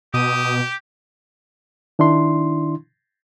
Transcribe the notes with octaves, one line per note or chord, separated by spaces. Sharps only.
B2 G4 D#6
D#3 D4 E4 C6